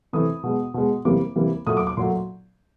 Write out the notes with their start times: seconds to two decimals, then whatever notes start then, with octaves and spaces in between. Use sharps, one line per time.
0.13 C3 E3 A3 D#6
0.43 B2 G#3
0.74 B2 G#3
1.05 C3 E3 G3 A#3 D6
1.36 C3 E3 G3 A#3
1.67 A#2 F#3 A3 D#6
1.77 D6
1.87 D6
1.97 A#2 F#3 A3 C6